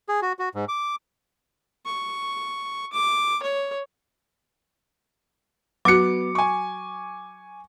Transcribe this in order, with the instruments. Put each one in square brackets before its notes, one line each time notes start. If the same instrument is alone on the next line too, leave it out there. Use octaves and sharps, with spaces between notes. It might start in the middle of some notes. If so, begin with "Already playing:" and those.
[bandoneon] G#4
F#4
F#4
G#2
D6
[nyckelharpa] C#6
D6
C#5
[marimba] F#3 F#4 [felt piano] B3 [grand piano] D6 C#7
[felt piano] G#5 C#6